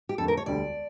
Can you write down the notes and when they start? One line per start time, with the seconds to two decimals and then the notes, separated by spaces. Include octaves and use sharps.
0.09 G4
0.18 F2 D3 A3 A4
0.28 A#4
0.37 C#5
0.46 E1 D2 D3 G3 D5